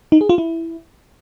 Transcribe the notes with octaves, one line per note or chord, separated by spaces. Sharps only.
D#4
G#4
F4
E4